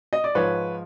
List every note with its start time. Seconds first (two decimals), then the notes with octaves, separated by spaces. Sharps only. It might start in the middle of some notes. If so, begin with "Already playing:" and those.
0.13 D#5
0.24 D5
0.35 G#2 F3 B4 C#5